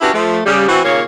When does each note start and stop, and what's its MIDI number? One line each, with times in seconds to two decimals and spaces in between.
0.01 0.11 61
0.01 0.11 62
0.01 0.11 64
0.01 0.11 66
0.01 0.11 67
0.01 0.11 71
0.13 0.41 53
0.13 0.41 57
0.46 0.68 49
0.46 0.68 55
0.68 0.81 52
0.68 0.81 60
0.68 0.81 66
0.84 1.03 39
0.84 1.03 46
0.84 1.03 49
0.84 1.03 58
0.84 1.03 73